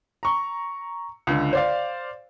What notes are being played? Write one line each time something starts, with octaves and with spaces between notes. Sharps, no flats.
A#5 C#6
C#2 D3
C5 D5 F5